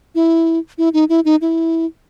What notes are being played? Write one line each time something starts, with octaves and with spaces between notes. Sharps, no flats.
E4
E4
D#4
E4
D#4
E4